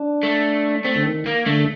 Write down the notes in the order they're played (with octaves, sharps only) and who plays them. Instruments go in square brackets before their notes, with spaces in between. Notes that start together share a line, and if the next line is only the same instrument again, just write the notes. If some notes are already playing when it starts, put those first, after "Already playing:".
Already playing: [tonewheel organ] D4
[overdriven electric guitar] A3
[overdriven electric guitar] A3 [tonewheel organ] C4
[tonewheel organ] D3
D#3
[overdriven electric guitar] A#3
[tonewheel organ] D3 [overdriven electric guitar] A3